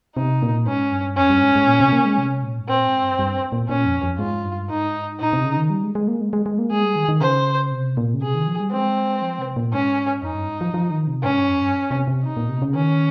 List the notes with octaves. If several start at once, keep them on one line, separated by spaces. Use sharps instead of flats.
C3 D#4
A#2
G#2 C#4
G2
F2 C#4
G2
G#2
G#2
A#2
C3
A#3
G#3
C3
A#2
G#2
A#2 C4
G#2
G2
G2
A#2
A#2 C#4
F2
F2
G#2 F4
G2
G#2 D#4
A#2 D#4
C3
C#3
D#3
G3
G#3
G#3
A#3
G#3
G#3
G#3
A#3
G#3 G#4
G3
D#3
D#3
C#3 C5
C3
A#2
C#3
C3 G#4
D#3
F3
G3
G#3 C4
F3
C3
A#2
G#2 C#4
F2 D#4
G2
G#2
F3
F3
D#3
C3
G#2 C#4
G2
F2
G2
C3
C3
D#4
A#2
C3
C#3
D#3 C#4